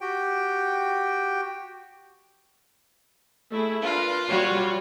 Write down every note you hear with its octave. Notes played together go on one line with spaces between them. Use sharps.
F#4 G4 G5
A3 E4 G#4
D4 F4 A#4 B4
G3 F#4 C#5